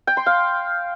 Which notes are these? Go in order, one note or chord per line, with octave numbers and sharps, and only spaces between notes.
G5
C6
F5